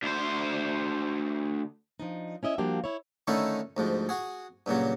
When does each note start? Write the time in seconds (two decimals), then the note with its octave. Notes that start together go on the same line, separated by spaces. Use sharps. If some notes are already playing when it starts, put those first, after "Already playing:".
0.03 D2 C5
2.00 F3 D4 D#4
2.43 C#4 E4 D#5 E5
2.58 F3 G3 A#3 D4 F#4 G4
2.84 E4 C#5
3.27 D3 D#3 A3 C#4 D#4 E4
3.77 D2 G#2 F3
4.09 F#4 G#4
4.66 G2 A#2 C#3 F#3